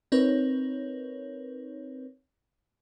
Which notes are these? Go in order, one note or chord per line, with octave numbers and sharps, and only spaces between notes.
C4 D#4 A#4 B4 C#5